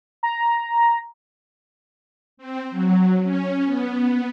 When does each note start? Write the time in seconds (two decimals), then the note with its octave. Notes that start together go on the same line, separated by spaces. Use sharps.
0.23 A#5
2.37 C4
2.70 F#3
3.22 C#4
3.65 B3